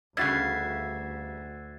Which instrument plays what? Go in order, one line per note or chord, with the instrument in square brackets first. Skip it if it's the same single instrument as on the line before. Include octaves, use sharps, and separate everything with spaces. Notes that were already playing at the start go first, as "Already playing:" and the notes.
[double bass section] D2 [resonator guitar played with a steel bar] G2 C#3 [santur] F#4 E5 [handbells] G#6 A6 C7